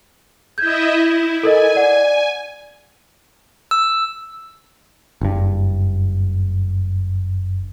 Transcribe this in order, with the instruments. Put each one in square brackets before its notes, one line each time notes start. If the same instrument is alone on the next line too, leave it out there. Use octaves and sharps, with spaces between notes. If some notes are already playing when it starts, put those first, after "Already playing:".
[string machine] E4 D#5 E5 [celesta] G6 G#6
[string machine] E4
[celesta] A4 A#4 D#5 [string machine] G#5
[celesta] D5 F#5
[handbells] E6
[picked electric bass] F#1 G2